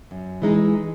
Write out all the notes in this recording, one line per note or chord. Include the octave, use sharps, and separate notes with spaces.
F#2
E3 G#3 D#4